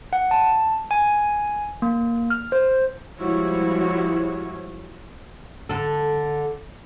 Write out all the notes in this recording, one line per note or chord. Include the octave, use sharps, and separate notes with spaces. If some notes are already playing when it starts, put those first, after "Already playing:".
F#5
A5
G#5
A#3
F6
C5
F3 G3 G#3 E4 F#4 C#5
D3 A4